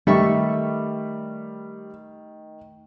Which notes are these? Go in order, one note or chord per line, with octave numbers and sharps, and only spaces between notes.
D#3 G3 A3 E5 C#6